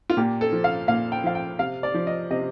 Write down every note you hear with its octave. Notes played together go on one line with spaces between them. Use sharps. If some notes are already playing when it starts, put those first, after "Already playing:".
F4
A#2 G4
A4
F3
F5
A#2 F5
G5
F3 F5
G5
C3 F5
D5
F3
D#5
C3 D#5